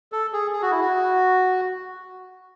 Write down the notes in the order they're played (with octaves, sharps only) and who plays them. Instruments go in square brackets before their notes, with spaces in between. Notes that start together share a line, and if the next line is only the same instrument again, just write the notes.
[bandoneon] A4
G#4
G#4
F#4
E4
F#4